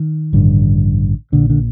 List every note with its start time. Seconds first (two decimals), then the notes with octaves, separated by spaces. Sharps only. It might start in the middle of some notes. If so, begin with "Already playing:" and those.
Already playing: D#3
0.33 A1 G2 D3
1.32 A#1 A#2 D3
1.50 D3